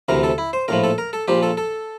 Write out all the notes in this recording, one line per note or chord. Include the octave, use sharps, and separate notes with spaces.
D2 C3 E3 A#4
A4
E4
C5
A#1 A2 F3 A#4
A4
A#4
A4
A#1 A#2 F3 G4
A4
A4